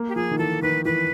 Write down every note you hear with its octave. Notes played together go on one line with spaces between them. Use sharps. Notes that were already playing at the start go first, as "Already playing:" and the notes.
Already playing: A#3
G4
F3 G#4
D#3
E3 A4
D#3 B4
E3 B4